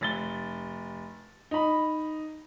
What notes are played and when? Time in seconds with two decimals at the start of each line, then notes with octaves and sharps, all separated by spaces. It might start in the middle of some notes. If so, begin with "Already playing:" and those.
0.01 F1 A6 G7
1.51 D#4 B5